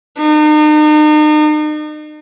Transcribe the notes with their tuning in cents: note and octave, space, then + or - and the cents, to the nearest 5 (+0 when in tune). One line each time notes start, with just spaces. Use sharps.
D#4 -40